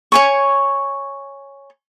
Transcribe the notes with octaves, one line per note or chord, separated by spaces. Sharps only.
C#5 G#5 C#6